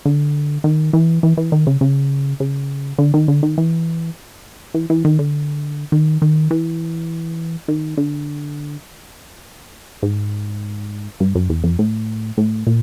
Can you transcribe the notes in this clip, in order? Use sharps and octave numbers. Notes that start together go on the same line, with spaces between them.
D3
D#3
E3
E3
E3
D#3
C#3
C#3
C#3
D3
D#3
D3
D#3
E3
E3
E3
D#3
D3
D#3
D#3
E3
D#3
D3
G#2
G2
F#2
E2
F2
A2
A2
A#2